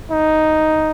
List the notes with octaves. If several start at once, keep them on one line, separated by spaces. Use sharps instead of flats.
D#4